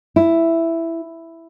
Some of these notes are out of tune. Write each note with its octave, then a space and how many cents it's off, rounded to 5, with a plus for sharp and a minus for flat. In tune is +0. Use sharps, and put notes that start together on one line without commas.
E4 +5